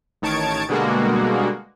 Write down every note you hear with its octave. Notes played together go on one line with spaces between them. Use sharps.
A1 D#3 C#5 A5 G#6 D7
B2 D3 G3 G#3 A#3 F#4